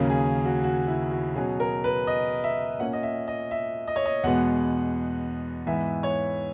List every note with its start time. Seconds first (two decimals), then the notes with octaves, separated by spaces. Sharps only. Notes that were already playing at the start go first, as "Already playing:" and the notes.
Already playing: D#2 C#3 F#3 A#3 C#4
0.10 G#4
0.45 F#4
0.64 F#4
0.87 E4
1.11 F#4
1.36 B2 F#3 C#4 G#4
1.60 A#4
1.84 B4
2.07 D#5
2.44 E5
2.79 A#2 A#3 C#4 F#5
2.93 D#5
3.03 E5
3.28 D#5
3.51 E5
3.88 D#5
3.96 C#5
4.06 D#5
4.23 E2 B2 G#3 B3 F#5
5.66 G#2 E3 B3 E5
6.03 C#5